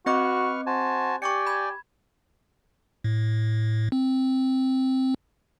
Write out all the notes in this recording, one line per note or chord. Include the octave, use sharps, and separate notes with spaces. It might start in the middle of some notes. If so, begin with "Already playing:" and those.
C4 F#4 B4 D#5 C#6 D6 F6
F#4 C5 G#5 A5
G4 D5 G5 G#5 C#6 D6 C#7
B5 G#6
A2
C4